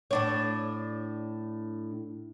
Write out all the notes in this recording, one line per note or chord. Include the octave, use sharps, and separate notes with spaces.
A2 D4 C#5